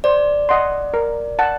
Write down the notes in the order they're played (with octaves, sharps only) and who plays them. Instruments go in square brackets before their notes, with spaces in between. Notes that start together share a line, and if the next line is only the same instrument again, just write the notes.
[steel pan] C5 [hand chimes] D5
[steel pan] D#5 F#5 C6
A#4
F#5 A5